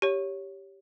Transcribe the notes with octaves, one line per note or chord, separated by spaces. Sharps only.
G4 C#5